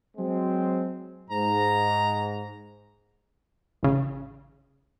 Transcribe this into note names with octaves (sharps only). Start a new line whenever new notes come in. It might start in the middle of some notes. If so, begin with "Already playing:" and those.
F#3 G#3 C4
G#2 A#5
A1 C#3